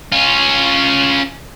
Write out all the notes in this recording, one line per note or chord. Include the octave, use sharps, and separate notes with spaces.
C#4 F4